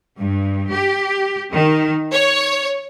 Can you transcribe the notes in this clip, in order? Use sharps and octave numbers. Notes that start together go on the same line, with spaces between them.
G2
G4
D#3
C#5